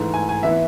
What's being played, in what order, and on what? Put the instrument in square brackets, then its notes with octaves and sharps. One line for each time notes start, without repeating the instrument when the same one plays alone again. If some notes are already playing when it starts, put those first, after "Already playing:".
Already playing: [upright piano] G#2 E3 A3
G#5
G#5
E3 B3 E5